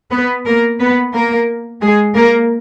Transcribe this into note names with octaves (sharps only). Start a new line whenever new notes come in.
B3 B4
A#3 A#4
B3 B4
A#3 A#4
G#3 G#4
A#3 A#4